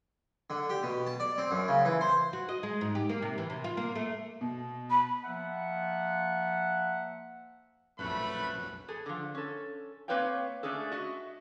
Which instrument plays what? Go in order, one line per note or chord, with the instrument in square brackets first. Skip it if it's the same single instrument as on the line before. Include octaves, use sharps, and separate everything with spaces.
[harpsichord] D3
G4
B2
A5
D5
C4
F#2
C#3
E3
C5
[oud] F#4
D#5
G#3
G#2
G4
A#3
C3
E3
C3
F4
A#3
A3
[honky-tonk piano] B2
[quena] B5
[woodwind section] F3 A#3 E5 F#5
[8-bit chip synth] A#1 F#2 [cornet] A3 [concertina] B4 [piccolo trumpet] B5
[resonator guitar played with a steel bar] G#4 A4
D3 F3
C#4 A4
A#3 C4 B4 C#5 F5 G5
A3 C#4 D4 G#4 A4
F#4 D#5 E5